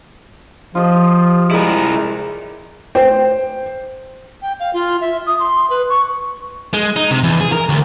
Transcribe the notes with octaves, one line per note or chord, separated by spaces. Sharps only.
F3 F4 G4 D#5
G#3 E4 A#4 D5
C5 G5
G5
F5
F4
E5
D#6
C6
B4
C#6
G#3
D#4
C3
E2
G#4
A#4
D2